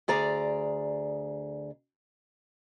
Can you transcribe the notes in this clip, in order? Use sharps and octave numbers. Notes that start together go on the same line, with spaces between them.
D2 G#4 D5 A#5